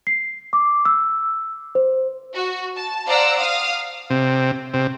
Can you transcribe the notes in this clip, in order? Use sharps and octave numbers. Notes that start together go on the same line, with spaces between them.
C7
D6
E6
C5
F#4
A5
C5 D5 F5 F#5 A#5 E6
F5 D#6 F6
C3
C3